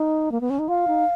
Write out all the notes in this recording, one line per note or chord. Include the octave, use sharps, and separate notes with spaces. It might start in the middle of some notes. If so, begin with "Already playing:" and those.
Already playing: D#4
A#3
B3
C#4
D#4
F4 F5
D#4